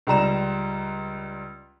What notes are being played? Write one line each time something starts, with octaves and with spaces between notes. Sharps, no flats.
C#2 G3 A#5 E7